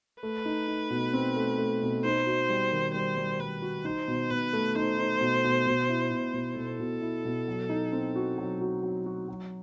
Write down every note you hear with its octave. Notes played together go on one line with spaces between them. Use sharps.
A3 B4
D#4
D#4
B2
C4
A3
A3
B2
D#4 C5
F#4
G3
D#3
G3 C5
G3
G3 B4
F#4
D#4 C5
B2
B2 B4
A3
D#4 C5
D#4
B2
B2
B2
E4
B2
B2
B2 A4
B2
E4
B2
F#3
D#4
C4
F#4
F#3
F#4
F#3
F#4
F#3